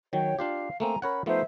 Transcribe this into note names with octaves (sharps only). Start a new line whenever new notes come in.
D#3 F#3 C#5 G5
D4 F4 G4 F5
A3 A#3 C4 G#5 A#5
C#4 A#4 C#5 F#5 B5
F3 A3 B3 D#4 C5 E5